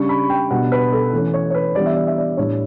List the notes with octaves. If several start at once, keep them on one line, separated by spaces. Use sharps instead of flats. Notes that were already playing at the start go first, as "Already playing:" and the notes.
Already playing: C#3 G3 D4 C#6
B5
G5
B2 G3 B3 D4 F#5
B4
A4
E3 A3 C#4
C#5
C#5
B4
E3 G3 B3 D4 D5
E5
D5
E5
D5
A2 G3 D4 C#5